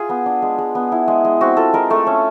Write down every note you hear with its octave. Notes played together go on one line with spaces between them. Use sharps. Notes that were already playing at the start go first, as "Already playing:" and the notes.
Already playing: F4 G#4
B3
D4
G#3
G#3
B3
E4
G#3
G#3
C4 F#4
F4 A4
G#3 A#4
A3 A4
C#4